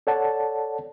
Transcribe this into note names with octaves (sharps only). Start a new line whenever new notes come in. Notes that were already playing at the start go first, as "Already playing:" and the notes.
A4 C#5 D5 F#5 A5